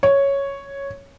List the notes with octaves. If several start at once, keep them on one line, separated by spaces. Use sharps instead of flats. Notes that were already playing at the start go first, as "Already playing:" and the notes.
C#5